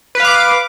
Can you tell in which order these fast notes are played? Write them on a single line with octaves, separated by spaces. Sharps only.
B4 F5 D6